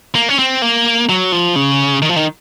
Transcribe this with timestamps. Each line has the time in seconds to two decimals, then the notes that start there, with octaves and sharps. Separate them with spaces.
0.15 A#3
0.29 C#4
0.39 C4
0.62 A#3
1.09 F#3
1.32 F3
1.56 C#3
2.02 D#3
2.09 F3
2.16 D#3